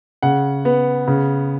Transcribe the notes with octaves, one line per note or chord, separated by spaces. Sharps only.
C#3 F#5
B3
C#3